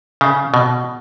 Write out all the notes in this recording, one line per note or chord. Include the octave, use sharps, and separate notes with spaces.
C#3
B2